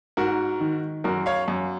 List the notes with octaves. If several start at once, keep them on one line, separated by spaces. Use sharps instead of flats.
G#2 F#4 A#4
D#3
F#2 F#4 A#4
C#5 F5
F#2